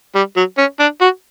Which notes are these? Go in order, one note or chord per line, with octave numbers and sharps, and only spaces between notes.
G3
F#3
C#4
D4
F#4